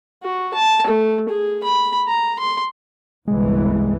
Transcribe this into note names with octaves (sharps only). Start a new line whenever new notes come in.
F#4
A5
A3
G#4
B5
A#5
C6
G1 C2 E3 G#3